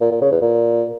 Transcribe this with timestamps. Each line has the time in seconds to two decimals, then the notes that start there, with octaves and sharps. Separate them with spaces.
0.01 A#2
0.11 A#2
0.21 C#3
0.31 E2
0.41 A#2